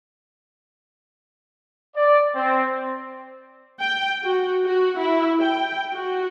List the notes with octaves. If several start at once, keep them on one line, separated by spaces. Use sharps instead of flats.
D5
C4
G5
F#4
F#4
E4
G5
F#4